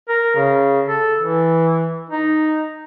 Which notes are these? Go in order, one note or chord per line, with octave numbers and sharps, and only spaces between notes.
A#4
C#3
A4
E3
D#4